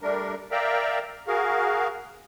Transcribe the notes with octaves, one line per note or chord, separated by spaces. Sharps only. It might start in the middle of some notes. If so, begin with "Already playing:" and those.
G3 A3 D4 A#4
A#4 D5 E5 F5 G5 A#5
F#4 G#4 A#4 F5